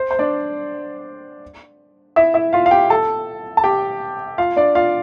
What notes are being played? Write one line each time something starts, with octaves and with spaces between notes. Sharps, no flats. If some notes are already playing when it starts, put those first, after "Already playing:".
Already playing: C5
C5
D4 D5
E4 E5
E4 E5
F4 F5
F5
G4 G5
A4 A5
A5
G4 G5
F4 F5
D4 D5
F4 F5